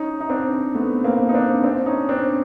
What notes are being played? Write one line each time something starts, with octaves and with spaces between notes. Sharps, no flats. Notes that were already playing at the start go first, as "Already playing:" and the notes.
Already playing: C#4 D#4
D#4
C4 D4
A3 B3
A#3 C4
D#4
C4 D4
C4 D4
C#4 D#4
C4 D4